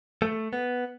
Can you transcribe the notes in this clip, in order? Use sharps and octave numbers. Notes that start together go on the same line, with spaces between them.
A3
B3